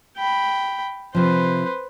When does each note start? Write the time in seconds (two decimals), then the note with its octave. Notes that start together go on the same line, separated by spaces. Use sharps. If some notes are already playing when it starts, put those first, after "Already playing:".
0.17 G5 B5
1.15 C3 F3 B4 C5